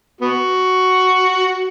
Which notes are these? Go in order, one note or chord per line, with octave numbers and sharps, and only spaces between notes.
B3 F#4